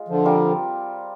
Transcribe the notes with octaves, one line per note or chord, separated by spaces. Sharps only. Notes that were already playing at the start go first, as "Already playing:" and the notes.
Already playing: G#3 F4
D3 F3
G3 C4 F4 A#4